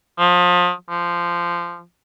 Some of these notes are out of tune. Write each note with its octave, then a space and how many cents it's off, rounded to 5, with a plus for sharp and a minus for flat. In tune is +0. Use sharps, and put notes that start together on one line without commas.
F3 +30
F3 -15